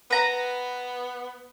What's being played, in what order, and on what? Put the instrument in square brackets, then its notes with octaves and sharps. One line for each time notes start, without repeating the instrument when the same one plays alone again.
[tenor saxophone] B3 [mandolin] B4 A#5